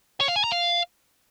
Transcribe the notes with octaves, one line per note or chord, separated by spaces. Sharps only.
C#5
F5
G#5
A#5
F5